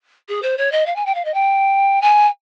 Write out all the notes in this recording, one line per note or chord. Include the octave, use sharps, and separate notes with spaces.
G#4
C5
C#5
D#5
F5
G#5
G5
F5
D#5
G5
G#5